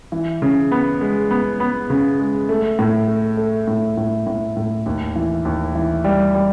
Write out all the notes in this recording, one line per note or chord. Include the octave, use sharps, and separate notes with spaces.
E3
C#3
B3
G#3
B3
B3
C#3
G#3
A3
A2
A3
A3
A2
A2
A2
A2
D#2
E3
D#2
E3
G3
G3